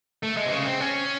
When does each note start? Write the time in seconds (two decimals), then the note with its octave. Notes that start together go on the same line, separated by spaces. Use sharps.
0.23 A3
0.37 G#3
0.46 C3
0.52 C#3
0.66 C4
0.80 C#4